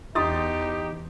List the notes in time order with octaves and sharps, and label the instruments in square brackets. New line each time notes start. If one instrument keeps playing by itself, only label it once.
[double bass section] E2 [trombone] D#4 [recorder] G4 [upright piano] C6 D#6 A6